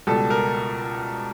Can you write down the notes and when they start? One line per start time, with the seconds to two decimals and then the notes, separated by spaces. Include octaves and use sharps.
0.07 C#2 B2 G3 A4
0.30 A#4